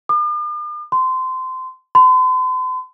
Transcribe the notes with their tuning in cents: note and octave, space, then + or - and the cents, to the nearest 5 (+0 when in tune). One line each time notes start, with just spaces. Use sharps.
D6 +45
C6 -20
C6 -45